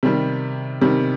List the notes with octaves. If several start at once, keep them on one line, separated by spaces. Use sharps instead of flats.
C3 D#3 G3
C3 D#3 G3